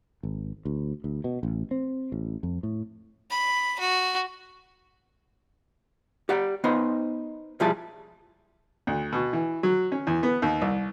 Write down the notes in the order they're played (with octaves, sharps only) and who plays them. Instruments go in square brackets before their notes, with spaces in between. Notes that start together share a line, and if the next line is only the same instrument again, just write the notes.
[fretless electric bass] G#1
D2
D2
B2
A1
C4
A1
F2
A2
[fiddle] B5
F#4
[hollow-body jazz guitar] G4 D5 F#5
B3 D#4 C5 D#5
B1 F3 G3 E4 G#4 A5
[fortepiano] D2
B2
E3
F#3
C#4
E2
B3
D#2
C2